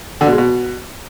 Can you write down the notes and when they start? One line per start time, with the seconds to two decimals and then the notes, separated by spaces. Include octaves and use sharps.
0.21 D3
0.27 B2
0.32 G#3
0.38 B2